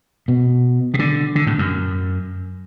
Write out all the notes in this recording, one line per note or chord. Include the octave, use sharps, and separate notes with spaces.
B2
B2
D3
D3
A2
F#2